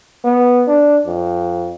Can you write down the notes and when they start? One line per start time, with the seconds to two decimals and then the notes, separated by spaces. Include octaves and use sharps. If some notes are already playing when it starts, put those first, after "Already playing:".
0.24 B3
0.68 D4
1.06 F2